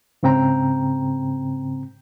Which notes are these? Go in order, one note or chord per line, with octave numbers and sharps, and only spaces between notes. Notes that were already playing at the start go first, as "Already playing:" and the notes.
G#2 C#3 C4 G5 A#5